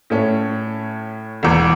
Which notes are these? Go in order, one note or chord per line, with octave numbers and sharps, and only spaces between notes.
A2 A3 C#4
E1 E2 E3